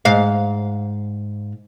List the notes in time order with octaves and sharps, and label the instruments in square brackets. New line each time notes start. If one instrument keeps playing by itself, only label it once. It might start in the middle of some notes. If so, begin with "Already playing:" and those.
[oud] G#2 F5